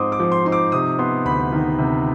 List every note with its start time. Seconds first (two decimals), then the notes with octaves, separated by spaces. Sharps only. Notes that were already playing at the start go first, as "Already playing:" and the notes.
Already playing: G#2 F3 C4 D#4 C6 D6 D#6
0.12 D6
0.19 F3
0.32 C6
0.45 D#4 C6
0.52 D6
0.72 C3 D#6
0.99 B3 C6
1.25 D2 B5
1.52 D#3
1.79 C3